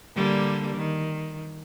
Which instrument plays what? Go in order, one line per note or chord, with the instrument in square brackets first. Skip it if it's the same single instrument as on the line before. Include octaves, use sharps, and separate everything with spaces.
[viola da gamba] D3 G3 A#3
D#3